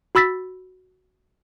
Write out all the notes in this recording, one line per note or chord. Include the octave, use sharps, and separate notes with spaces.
F#4 B5 E6 A6 B6